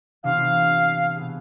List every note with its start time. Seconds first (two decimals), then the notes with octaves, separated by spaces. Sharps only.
0.24 C3 E3 B3 D4 F4 F5
1.16 B2 B3 E4 G#4